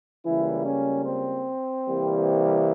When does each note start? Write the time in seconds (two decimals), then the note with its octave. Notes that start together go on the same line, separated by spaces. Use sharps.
0.25 C#2 C#3 E3 G3 A#3 E4
0.65 C#4
1.06 C4
1.86 C2 C3 E3 G3 A#3